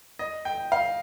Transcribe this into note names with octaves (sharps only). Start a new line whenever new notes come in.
D#5
G5
F5